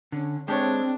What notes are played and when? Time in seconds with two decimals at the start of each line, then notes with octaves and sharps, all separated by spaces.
0.12 D3 C#4
0.48 G#3 C4 D4 G4 A4 C#5